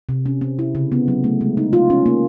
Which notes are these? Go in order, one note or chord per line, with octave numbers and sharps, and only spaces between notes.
C3
C#4
C4
E4
C#3
B3
F#3
A3
G#3
D#4
F4
C#4
A#3